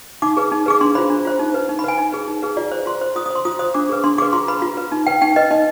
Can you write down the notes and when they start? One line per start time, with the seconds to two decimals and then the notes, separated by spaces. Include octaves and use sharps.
0.22 D#4 D6
0.37 G#4 B4
0.52 D#4
0.66 G#4 B4 D6
0.81 D4 C6
0.95 F4 C5 B5
1.10 D4
1.25 F4 C5
1.39 D#4
1.54 B4
1.69 D#4
1.79 B5
1.84 B4 G#5
1.98 D#4
2.12 G#4 B4
2.28 D#4
2.42 G#4 B4
2.57 F4 D5
2.71 C5
2.86 F4 C6
3.01 C5
3.16 F4 D#6
3.26 D#6
3.30 C5
3.35 C6
3.45 F4 D#6
3.59 C5 D#6
3.74 D4 D6
3.89 G#4 B4
4.04 D4 C6
4.18 G#4 B4 D6
4.33 F4 C6
4.48 B4 B5
4.62 F4
4.77 B4
4.92 D#4
5.06 B4 G5
5.21 D#4 G5
5.36 B4 D#5
5.51 D#4 D#5